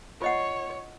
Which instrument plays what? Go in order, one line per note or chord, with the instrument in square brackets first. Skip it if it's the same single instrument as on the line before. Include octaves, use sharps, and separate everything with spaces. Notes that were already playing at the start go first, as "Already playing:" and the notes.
[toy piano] F4 D#5 F#5 [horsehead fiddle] C#5